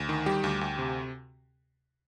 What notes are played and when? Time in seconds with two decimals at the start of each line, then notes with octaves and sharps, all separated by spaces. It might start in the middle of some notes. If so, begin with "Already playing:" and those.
Already playing: D2
0.09 D#3
0.26 G3 G4
0.44 D2
0.61 D2
0.79 C3